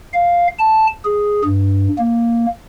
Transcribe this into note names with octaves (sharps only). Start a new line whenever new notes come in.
F5
A5
G#4
G2
A#3